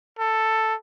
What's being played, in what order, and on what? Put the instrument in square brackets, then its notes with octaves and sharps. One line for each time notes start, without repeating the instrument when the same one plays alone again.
[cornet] A4